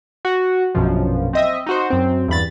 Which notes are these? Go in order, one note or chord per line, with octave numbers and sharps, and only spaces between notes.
F#4
A#1 F#2 B2 F3
C4 D#5 E5
D#4 F#4 C5
F#2 C4
E2 G2 B5 A6